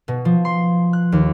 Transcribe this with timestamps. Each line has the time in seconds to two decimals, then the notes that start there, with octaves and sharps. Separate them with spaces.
0.08 B2
0.25 F3
0.45 C6
0.93 F#6
1.12 D#2